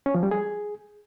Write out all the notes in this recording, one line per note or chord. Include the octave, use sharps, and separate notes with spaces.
C#4
F3
G3
G#4